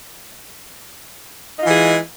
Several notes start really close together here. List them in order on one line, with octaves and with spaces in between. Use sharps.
D#4 F4 E3 G#4 G#3